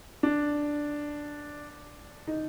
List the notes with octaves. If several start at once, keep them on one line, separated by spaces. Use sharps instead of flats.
D4
D#4